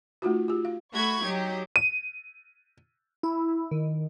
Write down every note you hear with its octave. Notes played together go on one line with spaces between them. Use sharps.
A3 D#4 F4 F#4
F4 G4
F5
A3 F#4 B5 C#6 G#6
F#3 D#4 G4
D#7
E4
D#3